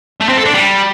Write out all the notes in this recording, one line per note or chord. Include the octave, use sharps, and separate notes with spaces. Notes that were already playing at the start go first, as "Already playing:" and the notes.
A3
C4
A4
D4
G3